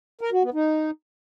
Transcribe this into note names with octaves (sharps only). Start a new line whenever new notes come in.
A#4
F#4
B3
D#4